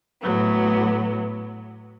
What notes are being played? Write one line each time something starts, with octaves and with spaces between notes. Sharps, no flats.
A2 F#3 B3